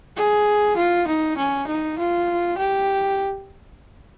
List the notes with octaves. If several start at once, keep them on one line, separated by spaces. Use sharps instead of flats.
G#4
F4
D#4
C#4
D#4
F4
G4